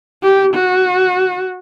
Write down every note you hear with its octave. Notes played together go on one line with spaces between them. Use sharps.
G4
F#4